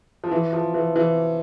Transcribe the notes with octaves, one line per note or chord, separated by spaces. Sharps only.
F3
E3
F3
E3
E3